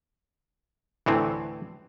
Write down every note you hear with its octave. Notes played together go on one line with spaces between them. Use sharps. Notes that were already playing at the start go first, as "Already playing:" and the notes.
D2 A2 E3 C4